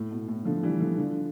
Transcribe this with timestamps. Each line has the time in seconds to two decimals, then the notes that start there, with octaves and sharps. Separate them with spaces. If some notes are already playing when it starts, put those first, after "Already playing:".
Already playing: A2
0.11 B2
0.28 A2
0.45 D3 F3
0.63 E3 G3
0.80 D3 F3
0.98 D3 F3